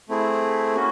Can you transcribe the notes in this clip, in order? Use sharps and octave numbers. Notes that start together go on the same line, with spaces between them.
A3 C4 E4 G#4
A#3 C#4 F#4